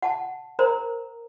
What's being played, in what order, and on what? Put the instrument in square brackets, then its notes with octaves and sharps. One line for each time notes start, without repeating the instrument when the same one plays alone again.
[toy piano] F#5 A5
A#4 C5 A#5